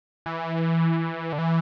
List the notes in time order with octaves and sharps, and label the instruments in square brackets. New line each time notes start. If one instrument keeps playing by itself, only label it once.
[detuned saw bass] E3
D3
E3